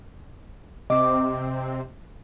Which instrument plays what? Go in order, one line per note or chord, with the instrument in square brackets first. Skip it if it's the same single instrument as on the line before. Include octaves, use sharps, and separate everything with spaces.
[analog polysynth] C3 C4 [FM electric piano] D#5 [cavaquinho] D6